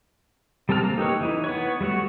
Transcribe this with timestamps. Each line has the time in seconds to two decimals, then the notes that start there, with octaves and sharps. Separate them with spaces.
0.69 G3 C4 A4 A5 F6
0.84 A#3 A#5
0.98 D#4 G4 A4 B4 C#5
1.21 E3 D#4 E4
1.44 B3 B4 C#5
1.81 G3 A3 F#4 C#5